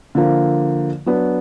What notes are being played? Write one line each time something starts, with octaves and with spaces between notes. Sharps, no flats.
D3 F3 A#3
F#3 B3 D4